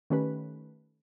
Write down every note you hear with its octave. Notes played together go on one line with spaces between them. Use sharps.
D#3 A3 C#4 G4 B4